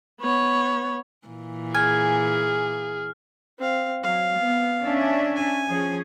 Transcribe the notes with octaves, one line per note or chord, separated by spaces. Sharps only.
B3 C#5
A#2 E3
G#4 G#5 F6
C4 F5
F#3 F5
B3
C#4 D4 E5
G#5
F3 C#4 G#4